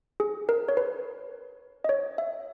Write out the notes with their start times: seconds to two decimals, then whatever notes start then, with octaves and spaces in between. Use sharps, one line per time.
0.20 G#4
0.49 A#4
0.68 C#5
0.77 B4
1.84 D#5
1.89 C#5
2.18 E5